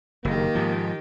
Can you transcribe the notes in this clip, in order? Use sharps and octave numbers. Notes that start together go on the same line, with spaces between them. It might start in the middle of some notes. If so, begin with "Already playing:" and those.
F#1 D#3 A#3 G4
G#2 F3